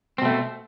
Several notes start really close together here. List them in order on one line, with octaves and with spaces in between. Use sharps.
C4 B2 A3